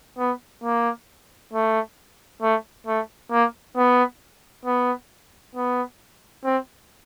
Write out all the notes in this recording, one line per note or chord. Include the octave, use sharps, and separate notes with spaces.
B3
A#3
A3
A3
A3
A#3
B3
B3
B3
C4